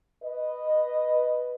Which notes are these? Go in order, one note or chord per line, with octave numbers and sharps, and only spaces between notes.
B4 D#5